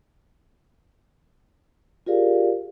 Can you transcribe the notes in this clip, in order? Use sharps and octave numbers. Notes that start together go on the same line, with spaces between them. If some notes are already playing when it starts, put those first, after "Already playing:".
F4 G4 G#4 A#4 D5 F5